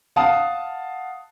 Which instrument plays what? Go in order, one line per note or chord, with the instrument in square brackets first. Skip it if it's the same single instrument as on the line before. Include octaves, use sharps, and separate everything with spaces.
[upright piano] F5 F#5 A5 D#6